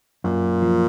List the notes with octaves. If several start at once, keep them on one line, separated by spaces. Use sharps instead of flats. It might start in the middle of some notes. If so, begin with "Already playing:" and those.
F#2 A#2
F3